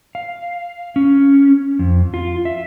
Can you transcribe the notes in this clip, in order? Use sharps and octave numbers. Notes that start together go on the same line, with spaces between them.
F5
C#4
F2
F4
E5